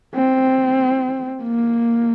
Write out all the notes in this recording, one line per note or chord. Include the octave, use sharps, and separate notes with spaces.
C4
A#3